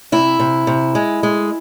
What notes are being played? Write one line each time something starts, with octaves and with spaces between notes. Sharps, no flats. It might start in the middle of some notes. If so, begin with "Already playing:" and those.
C3 E4
C3
C3
G#3
G#3